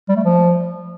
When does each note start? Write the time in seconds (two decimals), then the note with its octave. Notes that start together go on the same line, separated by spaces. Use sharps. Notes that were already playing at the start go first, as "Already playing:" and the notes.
0.08 G3
0.16 A3
0.24 F3